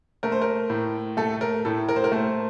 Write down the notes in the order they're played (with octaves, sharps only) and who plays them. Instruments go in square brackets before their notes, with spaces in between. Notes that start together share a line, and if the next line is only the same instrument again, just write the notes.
[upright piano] A3 A#4
C5
A#4
A2
A3 A4
A#4
A2 A4
A#4
C5
A#4
A3 C5